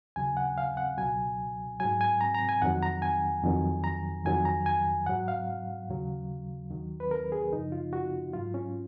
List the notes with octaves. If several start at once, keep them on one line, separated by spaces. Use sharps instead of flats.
D#2 C#3 F#3 G#5
F#5
F5
F#5
C#2 B2 F#3 G#5
G#2 F#3 G#5
G#5
A#5
A#5
G#5
F2 D#3 F#3 F#5
A#5
G#5
F2 D#3 F#3
A#5
F2 D#3 F#3 G#5
A#5
G#5
G#2 F#3 F#5
F5
D#2 C#3 F#3
D#2 D#3 F#3
B4
A#4
G#4
F#2 C#3 F3 D#4
F4
F#4
G#2 F#3 F4
C#4